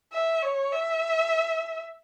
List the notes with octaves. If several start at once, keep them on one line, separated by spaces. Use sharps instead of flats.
E5
C#5
E5